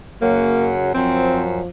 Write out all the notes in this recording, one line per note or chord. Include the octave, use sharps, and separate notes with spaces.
F#2 C#3 F#3 A#3
F#2 F3 C4